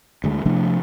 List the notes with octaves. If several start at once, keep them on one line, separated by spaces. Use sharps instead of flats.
D2 D3 G#3
C3 F3 A3 D4